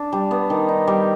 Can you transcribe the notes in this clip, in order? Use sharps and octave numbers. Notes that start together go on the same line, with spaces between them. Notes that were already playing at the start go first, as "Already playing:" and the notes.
Already playing: D4
G3
B3
D#3
D#4
G3